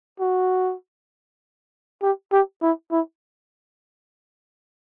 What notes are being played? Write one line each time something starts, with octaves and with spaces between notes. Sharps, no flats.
F#4
G4
G4
E4
E4